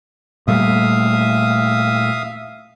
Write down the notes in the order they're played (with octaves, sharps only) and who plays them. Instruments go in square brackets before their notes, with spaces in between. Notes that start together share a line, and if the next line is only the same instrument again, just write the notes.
[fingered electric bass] A#2 G3 A3 [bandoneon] E5 F5 D#6